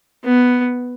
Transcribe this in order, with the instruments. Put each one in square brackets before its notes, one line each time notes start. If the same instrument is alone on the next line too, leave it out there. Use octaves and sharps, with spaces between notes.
[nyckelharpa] B3